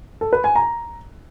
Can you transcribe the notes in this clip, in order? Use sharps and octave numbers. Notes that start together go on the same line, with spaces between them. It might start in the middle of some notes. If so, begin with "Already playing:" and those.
A4
B4
G#5
A#5